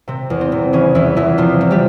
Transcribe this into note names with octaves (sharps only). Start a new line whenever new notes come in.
C3 C4
E2
C4
C3
C#3 E3 C#4
E2 E3 E4
E2 E3 E4
C3 F3 F4
C3
G3 G4